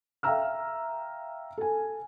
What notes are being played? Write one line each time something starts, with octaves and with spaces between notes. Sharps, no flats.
E5 F5 G5 A#5 E6 F6
A4 G#5